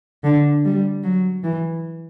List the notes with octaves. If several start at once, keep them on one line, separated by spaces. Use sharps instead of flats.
D3
G3
F#3
E3